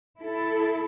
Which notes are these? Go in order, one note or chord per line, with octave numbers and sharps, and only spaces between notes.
E4 A4